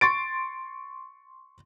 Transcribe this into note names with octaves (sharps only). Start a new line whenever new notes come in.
C6 C#6 A6 D7